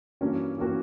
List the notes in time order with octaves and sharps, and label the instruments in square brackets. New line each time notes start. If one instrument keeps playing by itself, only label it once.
[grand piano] G2 E3 A#3 C#4 F#4
E3 A#3 C#4 F#4